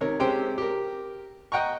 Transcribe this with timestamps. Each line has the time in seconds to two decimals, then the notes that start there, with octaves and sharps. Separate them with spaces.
0.01 C3 D#3 A#4 C#5
0.20 C3 G#3 C#4 G4 C5 G5
0.58 G4 A#4
1.52 D#5 F#5 G5 A#5 C#6